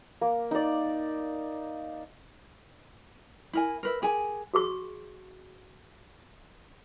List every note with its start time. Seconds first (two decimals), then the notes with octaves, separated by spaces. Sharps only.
0.21 A#3
0.51 D#4 D5
3.53 E4 A#4 G#5
3.83 A#4 B4 E5
4.02 G4 G#4 A#4 G#5
4.54 F#4 G#4 C#6